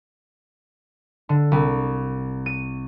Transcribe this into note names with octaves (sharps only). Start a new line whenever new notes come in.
D3
C2
D#7